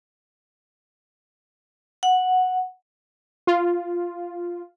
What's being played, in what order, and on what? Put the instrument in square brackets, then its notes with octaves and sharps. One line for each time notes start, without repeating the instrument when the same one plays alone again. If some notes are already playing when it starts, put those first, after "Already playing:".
[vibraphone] F#5
[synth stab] F4